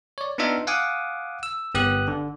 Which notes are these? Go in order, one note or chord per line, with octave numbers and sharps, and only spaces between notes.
C#5 D5
B3 D4 D#4 F4 E5 F5
F5 F#5 G#5 D6 D#6
E6
G1 B3 G4 D#6 F#6
D3